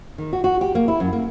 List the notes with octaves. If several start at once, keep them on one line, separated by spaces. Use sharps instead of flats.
D#3
F#4
F#4
G4
A#3
E4
F#2
A#3